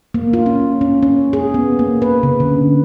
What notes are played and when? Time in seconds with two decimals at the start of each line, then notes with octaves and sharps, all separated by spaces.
0.14 A#3
0.33 F4
0.46 C#4
0.81 C#4
1.03 C#4
1.33 G#4
1.54 B3
1.79 A#3
2.02 B4
2.23 C#3
2.40 D3